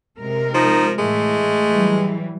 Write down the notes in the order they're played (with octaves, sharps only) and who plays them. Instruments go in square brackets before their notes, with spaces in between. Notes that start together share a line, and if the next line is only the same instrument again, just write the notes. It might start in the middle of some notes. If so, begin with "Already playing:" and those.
[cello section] C3 G#3 A#4
[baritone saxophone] F3 [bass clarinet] D#4
[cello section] A2 E3 [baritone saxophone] G#3 [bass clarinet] A3
[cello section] E3 F#3 G3